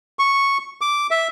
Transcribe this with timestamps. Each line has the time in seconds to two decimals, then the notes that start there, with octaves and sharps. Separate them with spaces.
0.19 C#6
0.81 D6
1.11 E5